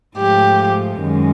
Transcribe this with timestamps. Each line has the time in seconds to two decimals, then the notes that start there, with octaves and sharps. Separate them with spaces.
0.17 G#2 F3 A3 G4
1.01 F#2 D#3 G#3